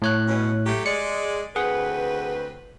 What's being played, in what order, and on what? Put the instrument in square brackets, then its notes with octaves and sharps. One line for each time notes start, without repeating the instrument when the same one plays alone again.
[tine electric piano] A2 C#5 F#6
[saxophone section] B2 C#4
F#3 A3 G4
[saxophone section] G#3 D5 [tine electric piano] C#7
[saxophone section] D2 C4 B4 [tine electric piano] G#4 F#5